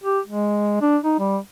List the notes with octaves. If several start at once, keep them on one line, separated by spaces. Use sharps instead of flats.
G4
G#3
D4
D#4
G3